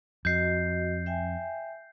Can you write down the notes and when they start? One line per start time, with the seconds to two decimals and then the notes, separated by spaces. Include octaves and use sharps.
0.25 F2 F#4 D#5 G6 C7
1.06 E5 G5 G#5